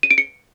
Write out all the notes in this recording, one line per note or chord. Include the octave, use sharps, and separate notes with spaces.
D#7
D7
C#7